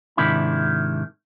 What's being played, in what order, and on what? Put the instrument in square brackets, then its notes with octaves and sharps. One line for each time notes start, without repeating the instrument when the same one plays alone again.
[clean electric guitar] G#2 C3 D#3 D4 E4 B5